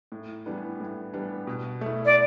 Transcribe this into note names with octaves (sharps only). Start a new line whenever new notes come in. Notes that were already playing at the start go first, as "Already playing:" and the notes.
A2
E3 G3 B3 D4
A2
E3 G3 B3 D4
B2
A3 E4
D5